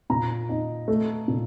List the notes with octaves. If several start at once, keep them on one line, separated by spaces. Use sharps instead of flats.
A#2 A#5
D#4
A3
A#2